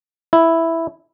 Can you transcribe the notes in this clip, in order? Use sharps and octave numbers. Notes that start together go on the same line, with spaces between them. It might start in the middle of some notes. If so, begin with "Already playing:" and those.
E4